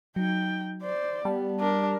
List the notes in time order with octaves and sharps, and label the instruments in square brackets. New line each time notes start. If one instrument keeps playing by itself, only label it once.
[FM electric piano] F#3 [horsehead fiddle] D#4 G5
[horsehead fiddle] C5 D5
[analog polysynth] G3 [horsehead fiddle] B3 [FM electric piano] A5
[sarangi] D4 [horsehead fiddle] A#4